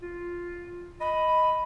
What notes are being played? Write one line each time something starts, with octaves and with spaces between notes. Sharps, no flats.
F4
D#5 B5